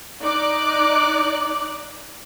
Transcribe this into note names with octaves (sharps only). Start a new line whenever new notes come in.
D#4 D5 D6 F#6